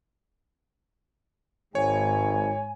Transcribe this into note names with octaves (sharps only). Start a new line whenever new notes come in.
G#1 G#2 C#5 G#5